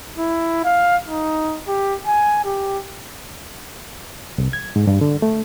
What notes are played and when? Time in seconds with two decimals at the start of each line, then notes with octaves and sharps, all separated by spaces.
0.18 E4
0.65 F5
1.08 D#4
1.67 G4
2.06 G#5
2.45 G4
4.38 C2
4.53 G#6
4.76 G#2
4.87 G2
5.01 D3
5.22 A3